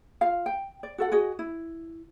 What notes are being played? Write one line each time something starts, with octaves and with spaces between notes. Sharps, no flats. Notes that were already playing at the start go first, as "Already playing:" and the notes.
F4 F5
G5
D5
F#4 A4 F#5
F#4 G#4 D#5
E4